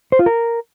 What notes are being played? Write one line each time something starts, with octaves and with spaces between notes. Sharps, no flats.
C5
F4
A#4